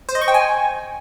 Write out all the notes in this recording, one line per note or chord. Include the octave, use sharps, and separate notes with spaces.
C5
D#5
C#6
G5
G#5